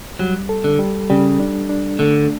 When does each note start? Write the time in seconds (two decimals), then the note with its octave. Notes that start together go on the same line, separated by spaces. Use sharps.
0.19 F#3 G3
0.49 A4
0.64 D3
0.79 G3
1.10 C#3 G3
1.40 D4
1.69 D4
1.99 D3 A3